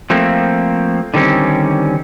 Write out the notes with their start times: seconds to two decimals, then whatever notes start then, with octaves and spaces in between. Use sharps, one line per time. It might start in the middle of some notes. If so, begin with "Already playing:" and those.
0.10 F3 A3 A#3 C4
1.14 D3 D#3 G3 C4 C#4